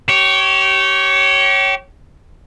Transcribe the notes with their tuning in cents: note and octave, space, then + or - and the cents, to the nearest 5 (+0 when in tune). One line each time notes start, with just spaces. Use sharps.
G4 -30 C#5 +0